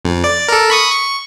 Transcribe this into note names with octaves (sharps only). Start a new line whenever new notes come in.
F2
D5
A4 A#4
B5 C#6 D#6
C#6